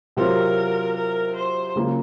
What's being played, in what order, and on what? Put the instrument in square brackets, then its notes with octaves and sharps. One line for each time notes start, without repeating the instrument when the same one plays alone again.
[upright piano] C3 F#3 C4 F4 [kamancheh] A#4
[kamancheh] A#4
C5
[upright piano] C#3 F#3 A#3 F4